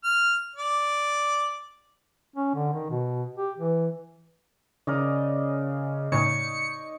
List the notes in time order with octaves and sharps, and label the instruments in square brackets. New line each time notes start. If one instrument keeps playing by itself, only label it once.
[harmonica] F6
D5
[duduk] C#4
D3
D#3
B2
G4
E3
[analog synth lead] C#3 [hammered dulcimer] A#4 D5 D#5
[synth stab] A2 C#3 [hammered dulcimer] D#4 [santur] C#5 [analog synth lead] C#7